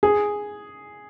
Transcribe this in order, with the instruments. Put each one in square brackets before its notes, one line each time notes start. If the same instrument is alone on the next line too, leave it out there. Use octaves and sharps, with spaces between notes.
[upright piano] G#4